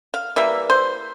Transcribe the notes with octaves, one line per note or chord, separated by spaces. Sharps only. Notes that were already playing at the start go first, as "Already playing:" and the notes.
F5
E3 G3 A#3 E5
C5